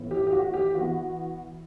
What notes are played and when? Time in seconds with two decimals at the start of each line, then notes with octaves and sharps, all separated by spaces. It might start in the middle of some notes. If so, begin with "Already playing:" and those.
Already playing: A2 E3 B3
0.11 G4
0.27 G4
0.32 F#4
0.54 G4
0.75 E3 B3 F#4